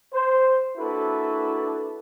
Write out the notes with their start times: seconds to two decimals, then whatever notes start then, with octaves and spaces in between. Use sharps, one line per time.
0.12 C5
0.77 A#3 D4 E4 F#4 A4 B4